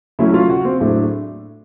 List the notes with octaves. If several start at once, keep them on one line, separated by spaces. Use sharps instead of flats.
C#3 F#3 A3 C#4 E4 E5
F4 F5
F#4 F#5
C4 C5
A2 F#3 A3 D4 G#4